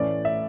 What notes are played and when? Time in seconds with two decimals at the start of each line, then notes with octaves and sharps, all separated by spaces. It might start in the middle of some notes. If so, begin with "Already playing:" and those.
Already playing: A2 E3 A3 C#4 D5
0.25 E5